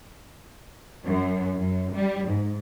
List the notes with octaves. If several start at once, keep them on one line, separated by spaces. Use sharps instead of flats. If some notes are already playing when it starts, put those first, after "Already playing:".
F#2
F#2
G3
G#2